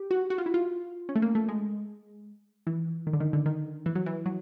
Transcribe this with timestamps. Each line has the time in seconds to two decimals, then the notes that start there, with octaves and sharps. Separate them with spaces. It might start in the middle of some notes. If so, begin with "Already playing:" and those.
Already playing: G4
0.11 F#4
0.30 F#4
0.38 F4
0.46 E4
0.54 F4
1.09 C#4
1.15 A3
1.22 A#3
1.35 A3
1.49 G#3
2.67 E3
3.07 D#3
3.13 D3
3.20 D#3
3.33 D3
3.46 D#3
3.86 E3
3.95 F#3
4.06 E3
4.26 F#3